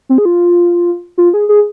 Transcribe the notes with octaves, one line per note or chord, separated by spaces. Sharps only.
C4
G#4
F4
F4
G#4
G#4